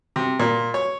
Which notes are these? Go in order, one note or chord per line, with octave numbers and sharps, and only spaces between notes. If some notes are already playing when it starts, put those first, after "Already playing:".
C3
A#2
C#5